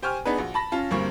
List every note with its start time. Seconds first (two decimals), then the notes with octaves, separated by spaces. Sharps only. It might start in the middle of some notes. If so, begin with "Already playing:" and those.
0.02 G4 C5 G5 G#5 C#6 F6
0.25 B3 D4 D#4 G#4 B4
0.38 A#1 F#4
0.54 A5 B5 A#6
0.72 C#4 F4 A5
0.91 D2 G2 G3 A#3 C4 C#6